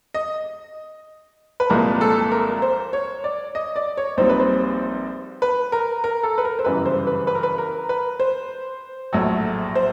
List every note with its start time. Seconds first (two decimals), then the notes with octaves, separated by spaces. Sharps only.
0.14 D#5
1.60 B4
1.70 C2 A#2 F3 G#3 A#4
2.01 A4
2.32 A#4
2.62 C5
2.93 C#5
3.24 D5
3.55 D#5
3.76 D5
3.97 C#5
4.17 A#1 A#2 G3 C4 D#4 C5
4.29 B4
4.40 C5
5.42 B4
5.72 A#4
6.04 A#4
6.23 A4
6.38 B4
6.45 A#4
6.59 C5
6.65 G1 F#2 C#3 E3 G3 B4
6.86 C5
7.07 B4
7.27 B4
7.35 A#4
7.43 B4
7.58 A#4
7.89 B4
8.20 C5
9.13 A#1 A2 F#3 A3
9.75 C5